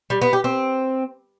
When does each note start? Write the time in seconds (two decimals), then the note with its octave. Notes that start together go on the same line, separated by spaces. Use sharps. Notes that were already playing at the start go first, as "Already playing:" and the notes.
0.10 G3
0.22 B3
0.33 G4
0.44 C4